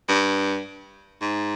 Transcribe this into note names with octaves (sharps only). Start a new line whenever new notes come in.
G2
G#2